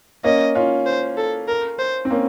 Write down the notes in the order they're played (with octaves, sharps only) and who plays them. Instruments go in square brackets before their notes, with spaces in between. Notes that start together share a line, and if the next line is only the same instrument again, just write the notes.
[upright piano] A#3 C#4 [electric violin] D#5
[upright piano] C#4 F4
[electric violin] C5
A4
A#4
C5
[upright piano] C4
A#3 C#4